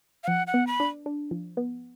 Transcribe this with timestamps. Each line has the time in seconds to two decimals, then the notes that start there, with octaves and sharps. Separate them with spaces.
0.24 F5
0.27 F3 F#5
0.47 F#5
0.54 B3
0.67 B5
0.80 D4
1.06 D4
1.31 F3
1.57 B3